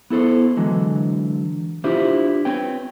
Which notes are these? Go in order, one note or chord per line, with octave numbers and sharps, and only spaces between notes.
B3 E4 A4 C5
D3 E3 F#3 G#3
D4 E4 F4 G4 C5
C4 B4 C#5 G5